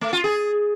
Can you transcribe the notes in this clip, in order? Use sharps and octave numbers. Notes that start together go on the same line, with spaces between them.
A3
F4
G#4